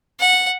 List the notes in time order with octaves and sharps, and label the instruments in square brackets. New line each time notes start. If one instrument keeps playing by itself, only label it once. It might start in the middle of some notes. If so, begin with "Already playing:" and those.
[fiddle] F#5